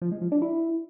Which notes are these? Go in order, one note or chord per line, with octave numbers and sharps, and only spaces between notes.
F3
G#3
F3
D4
E4